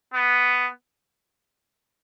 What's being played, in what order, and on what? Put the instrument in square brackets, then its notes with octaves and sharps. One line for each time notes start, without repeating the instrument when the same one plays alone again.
[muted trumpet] B3